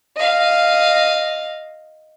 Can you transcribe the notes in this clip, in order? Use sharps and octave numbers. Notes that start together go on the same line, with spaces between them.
D#5 F5